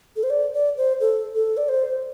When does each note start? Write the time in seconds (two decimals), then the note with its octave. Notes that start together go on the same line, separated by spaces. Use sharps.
0.16 A4
0.23 C5
0.30 D5
0.53 D5
0.77 C5
1.00 A4
1.34 A4
1.57 D5
1.68 C5